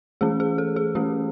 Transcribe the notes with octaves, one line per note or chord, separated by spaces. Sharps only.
E3 A3 C#4 G#4
G#4
A4
G#4
E3 A3 C#4 G4